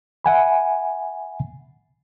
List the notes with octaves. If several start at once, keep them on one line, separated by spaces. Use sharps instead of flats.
E5 F#5 G#5 B5